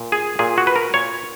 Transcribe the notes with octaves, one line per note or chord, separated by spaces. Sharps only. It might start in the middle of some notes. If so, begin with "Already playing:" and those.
Already playing: A#2
G#4
A#2 G#4
F#4
B4
A#4
A#2 C#5